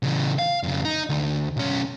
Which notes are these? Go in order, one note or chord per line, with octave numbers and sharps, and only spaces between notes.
C#3 E3
F5
F2 C#3
D#4
D2
B1 C#4